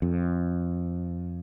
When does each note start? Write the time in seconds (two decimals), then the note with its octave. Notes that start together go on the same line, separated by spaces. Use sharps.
0.02 F2